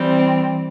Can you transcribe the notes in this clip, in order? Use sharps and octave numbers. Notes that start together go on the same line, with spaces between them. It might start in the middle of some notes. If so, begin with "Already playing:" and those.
Already playing: E3 G3 C4